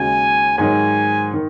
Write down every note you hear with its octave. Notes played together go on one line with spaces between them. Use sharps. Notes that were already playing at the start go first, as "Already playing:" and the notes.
Already playing: D#2 C#3 G#3 C#4 F#4 G#5
G#2 D#3 F#3 G#5
D#3